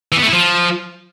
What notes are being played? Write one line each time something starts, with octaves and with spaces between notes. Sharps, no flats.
E3
B3
A3
E4
F3